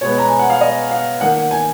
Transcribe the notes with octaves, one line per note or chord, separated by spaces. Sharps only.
B2 G#3 B3 C#5
A#5
G#5
F#5
F5
D#5
F5
D#3 A#3 F#5
F#5
G#5